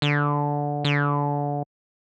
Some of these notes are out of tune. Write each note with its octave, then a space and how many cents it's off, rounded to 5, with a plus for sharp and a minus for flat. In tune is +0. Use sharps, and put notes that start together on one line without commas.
D3 -10
D3 -25